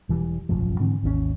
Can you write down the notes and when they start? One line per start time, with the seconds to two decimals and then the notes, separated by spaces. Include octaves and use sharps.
0.09 E1 E3 G3
0.49 E1 A1 F#2 F3
0.80 G#2 D3 E3 C4
1.03 G#1 D#2 D#3 C#4